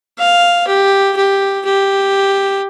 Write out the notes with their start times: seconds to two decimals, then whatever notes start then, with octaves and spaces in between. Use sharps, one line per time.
0.18 F5
0.67 G4
1.16 G4
1.65 G4